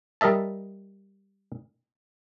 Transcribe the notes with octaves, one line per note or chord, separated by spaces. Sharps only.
G3 A#4 D#5 E5 A5